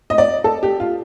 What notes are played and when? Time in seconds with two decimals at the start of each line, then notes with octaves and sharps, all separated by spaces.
0.10 D#5
0.18 D5
0.44 A4
0.63 G4
0.80 F4